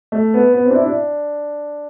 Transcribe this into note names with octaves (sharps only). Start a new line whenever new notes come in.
A3
B3
B3
C4
D4
E4
D4